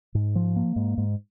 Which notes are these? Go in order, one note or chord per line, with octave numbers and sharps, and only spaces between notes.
G#2
F3
A#3
G#2
G#2